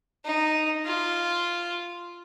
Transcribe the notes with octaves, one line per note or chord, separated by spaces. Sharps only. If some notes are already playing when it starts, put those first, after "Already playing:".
D#4
F4